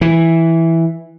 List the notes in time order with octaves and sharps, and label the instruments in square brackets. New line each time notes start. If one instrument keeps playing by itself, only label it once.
[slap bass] E3